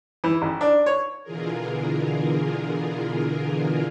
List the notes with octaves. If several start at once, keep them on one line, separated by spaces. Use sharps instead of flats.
E3
A1
D4
C#5
B2 D3 E3 F4 G#4 A#4